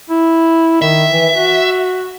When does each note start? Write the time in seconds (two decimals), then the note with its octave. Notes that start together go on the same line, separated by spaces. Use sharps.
0.10 E4
0.82 D#3 E5
1.11 E3
1.35 F#4